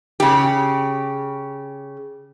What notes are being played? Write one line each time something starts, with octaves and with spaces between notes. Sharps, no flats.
C#3 G4